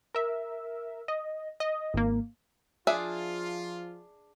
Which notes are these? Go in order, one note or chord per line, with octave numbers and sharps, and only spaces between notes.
A#4 E5
D#5
D#5
G#1 A#3
F3 D4 F4 G#4 E5